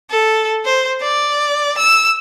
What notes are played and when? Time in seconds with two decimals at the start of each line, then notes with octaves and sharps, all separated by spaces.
0.10 A4
0.65 C5
1.02 D5
1.78 E6